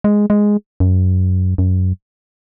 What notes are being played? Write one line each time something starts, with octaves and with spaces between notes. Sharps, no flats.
G#3
G#3
F#2
F#2